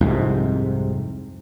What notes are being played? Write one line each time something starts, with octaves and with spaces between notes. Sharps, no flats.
C2 F2 G#2 C3